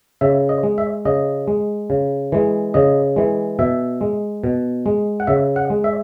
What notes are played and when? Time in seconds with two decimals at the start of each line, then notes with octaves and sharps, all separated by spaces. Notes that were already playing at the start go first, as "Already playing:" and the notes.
0.21 C#3 E5
0.49 D#5
0.63 G#3
0.78 E5
1.05 C#3 D#5
1.48 G#3
1.90 C#3
2.32 E3 G#3
2.74 C#3 D#5
3.16 E3 G#3
3.59 B2 E5
4.01 G#3
4.44 B2
4.86 G#3
5.20 F#5
5.27 C#3 E5
5.56 F#5
5.70 G#3
5.84 E5